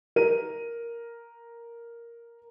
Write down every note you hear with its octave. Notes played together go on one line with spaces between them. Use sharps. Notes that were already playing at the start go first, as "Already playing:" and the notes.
A#4 D#7